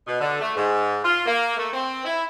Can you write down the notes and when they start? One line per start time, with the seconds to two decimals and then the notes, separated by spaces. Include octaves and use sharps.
0.07 B2
0.20 D3
0.40 A3
0.56 G#2
1.05 F4
1.26 A#3
1.57 A3
1.73 C4
2.05 E4